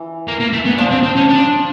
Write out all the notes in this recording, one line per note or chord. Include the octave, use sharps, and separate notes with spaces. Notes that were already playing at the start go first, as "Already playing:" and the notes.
Already playing: E3
A#3
A#3
A3
B3
F3 D4
C4
C4
C#4
D4